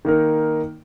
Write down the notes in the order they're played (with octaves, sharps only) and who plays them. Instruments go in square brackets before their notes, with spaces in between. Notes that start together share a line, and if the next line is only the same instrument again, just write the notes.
[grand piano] D#3 A#3 D#4 A#4